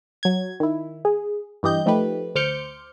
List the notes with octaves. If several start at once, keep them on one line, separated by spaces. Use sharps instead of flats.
F#3 G#6
D#3 E4
G#4
G2 E3 G4 D#5 G6
F3 A3 D#4 G4 B4
D2 C5 D6 F6 G6 C#7